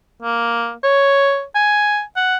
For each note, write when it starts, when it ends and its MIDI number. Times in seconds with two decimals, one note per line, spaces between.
0.22 0.71 58
0.84 1.43 73
1.55 2.01 80
2.16 2.37 78